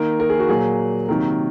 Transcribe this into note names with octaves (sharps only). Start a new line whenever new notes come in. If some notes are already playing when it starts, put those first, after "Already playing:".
Already playing: D#3 A#3 A#4
A#4
G#4
F#4
A#2 F#3 A#3 G#4
C3 D#3 F#3 A#3 A#4